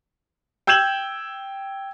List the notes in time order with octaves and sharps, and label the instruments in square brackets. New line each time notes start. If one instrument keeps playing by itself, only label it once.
[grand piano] G5 E6 G6 G#6 E7 F#7